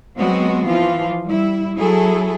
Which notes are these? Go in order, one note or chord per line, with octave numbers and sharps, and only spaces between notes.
F#3 G#3 B3 C4 F#4
E3 F3 F4
G3 E4
F#3 E4 G#4 A4